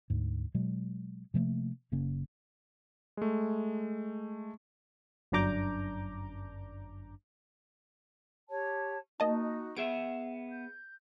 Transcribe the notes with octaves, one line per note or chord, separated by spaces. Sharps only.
D2 G#2
B2 F#3 G#3
C3 F3 A3 A#3
F#1 C#3 A#3 C#4
G#3 A3
G1 F#2 D4 A#5 D6 G6
G4 C#5 A5
A#3 D#4 F#4 D#5 A5
B3 G#4 E5 F#5 D7
G6